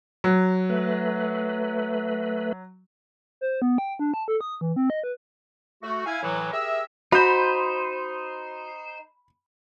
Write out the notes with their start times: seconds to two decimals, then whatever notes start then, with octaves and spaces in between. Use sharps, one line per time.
0.24 F#3
0.70 A3 B4
3.41 C5
3.62 B3
3.78 G5
3.99 D4
4.14 A5
4.28 A4
4.41 D#6
4.61 E3
4.76 C4
4.90 D#5
5.04 B4
5.83 A3 F#4
6.06 E4 F5 G#5
6.23 A2 E3 F#3
6.52 G4 G#4 A#4 E5
7.12 D#4 F#4 C5 B5 G6